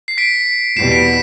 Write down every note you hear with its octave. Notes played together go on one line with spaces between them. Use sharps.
C7
B6 D7
E2 B2 G3 B3 C7 E7
B6 D7